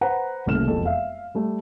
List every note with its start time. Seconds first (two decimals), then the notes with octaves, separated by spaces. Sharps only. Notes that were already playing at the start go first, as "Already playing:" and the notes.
0.01 B4 C5 F#5 A#5
0.46 D#1 C2 C#3 A3 F6 E7
0.67 E1 F2 A4
0.85 E5 F5
1.35 G3 A3